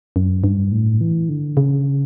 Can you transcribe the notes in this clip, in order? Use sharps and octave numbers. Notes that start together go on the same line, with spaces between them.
F#2
G2
A2
E3
D3
C#3